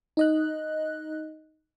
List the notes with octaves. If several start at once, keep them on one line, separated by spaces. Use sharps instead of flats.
D#4 D#5 F#6